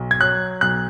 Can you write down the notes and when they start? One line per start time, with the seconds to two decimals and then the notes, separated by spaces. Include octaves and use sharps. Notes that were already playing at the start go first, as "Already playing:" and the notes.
Already playing: B1
0.11 G#6
0.20 F#3 F#6
0.61 B1 F#6